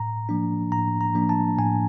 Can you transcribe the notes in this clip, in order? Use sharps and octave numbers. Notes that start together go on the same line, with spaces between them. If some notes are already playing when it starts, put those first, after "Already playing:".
Already playing: A2 A#5
F3 A#3 D4
A2 A#5
A#5
F3 A#3 D4
A5
A2 G#5